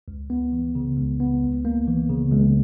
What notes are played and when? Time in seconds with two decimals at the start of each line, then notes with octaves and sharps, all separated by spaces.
0.08 C#2
0.30 B3
0.52 E3
0.75 C#3
0.97 C#2
1.20 B3
1.43 C#2
1.65 A#3
1.88 E3
2.10 C#3
2.32 C#2